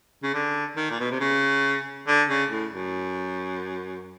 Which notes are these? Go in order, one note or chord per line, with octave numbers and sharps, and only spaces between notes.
C#3
D3
D#3
A#2
B2
C3
C#3
D3
C#3
A2
F#2